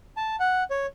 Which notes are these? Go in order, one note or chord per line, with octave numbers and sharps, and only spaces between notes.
A5
F#5
C#5